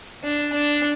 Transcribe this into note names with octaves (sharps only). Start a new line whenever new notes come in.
D4
D4